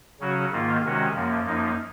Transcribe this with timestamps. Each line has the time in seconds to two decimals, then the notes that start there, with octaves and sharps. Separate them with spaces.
0.20 C#3 F#3 C#4 F#4
0.52 G#2 D#3 A#3 F4
0.83 C3 D#3 G#3 C#4 F#4
1.15 F#2 F3 A#3
1.46 F#2 F3 A#3 D#4